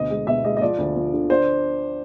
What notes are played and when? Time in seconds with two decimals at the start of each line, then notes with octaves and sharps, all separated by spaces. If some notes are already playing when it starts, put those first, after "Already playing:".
Already playing: D2 B2 D#5
0.10 G#3
0.27 B2 E5
0.44 G#3 D#5
0.57 D#5
0.61 F3 D5
0.78 D2
0.96 F3
1.13 D3
1.30 D4 C5